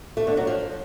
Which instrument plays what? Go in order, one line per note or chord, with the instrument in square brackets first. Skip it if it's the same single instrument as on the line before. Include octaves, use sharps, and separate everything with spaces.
[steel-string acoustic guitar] A3
D3
F#3
F3